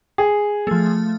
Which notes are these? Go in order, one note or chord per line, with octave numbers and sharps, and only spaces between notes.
G#4
F3 A3